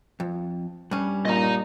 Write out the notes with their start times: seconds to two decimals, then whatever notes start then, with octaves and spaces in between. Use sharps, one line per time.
0.20 F2
0.91 G2 G3 C#4
1.25 A#2 D#5 A#5